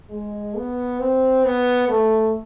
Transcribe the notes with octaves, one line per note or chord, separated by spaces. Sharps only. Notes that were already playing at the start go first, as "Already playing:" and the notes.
G#3
B3
C4
B3
A3